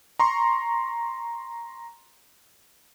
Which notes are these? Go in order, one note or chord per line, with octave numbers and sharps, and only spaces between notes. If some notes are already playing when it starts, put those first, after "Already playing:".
A#5 C6 C#6